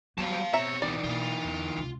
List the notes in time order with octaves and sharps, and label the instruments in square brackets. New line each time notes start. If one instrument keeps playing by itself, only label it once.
[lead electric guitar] F#3 G3 [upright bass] B3 E4 [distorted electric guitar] F5 A5
[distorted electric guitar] B2 C4 [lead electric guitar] C#5 [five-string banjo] E5 A#5
[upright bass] C#2 [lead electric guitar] E3 D#4 [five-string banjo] D5
[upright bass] B2 A#3 [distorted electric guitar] F4
[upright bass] E2
C#2 C3